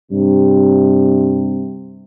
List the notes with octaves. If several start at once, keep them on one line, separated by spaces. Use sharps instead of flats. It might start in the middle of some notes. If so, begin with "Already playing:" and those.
G2 C3